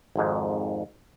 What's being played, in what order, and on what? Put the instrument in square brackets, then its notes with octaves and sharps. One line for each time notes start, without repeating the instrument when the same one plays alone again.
[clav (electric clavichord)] G#1 F2 G#2